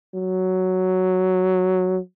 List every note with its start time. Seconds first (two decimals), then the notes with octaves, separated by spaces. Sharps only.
0.15 F#3